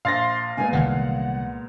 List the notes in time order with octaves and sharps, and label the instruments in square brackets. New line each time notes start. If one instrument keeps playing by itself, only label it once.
[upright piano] A#1 [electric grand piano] F5 A6 A#6 [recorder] C6
[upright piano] A#2 G#3 B3 [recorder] G#5
[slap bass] C2 D#3 E3 [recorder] F#5